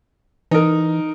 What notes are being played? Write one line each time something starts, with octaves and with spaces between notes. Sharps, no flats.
E3 D#4 A#4